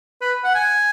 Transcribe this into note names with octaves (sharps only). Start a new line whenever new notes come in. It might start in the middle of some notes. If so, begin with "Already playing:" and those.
B4
F#5
G#5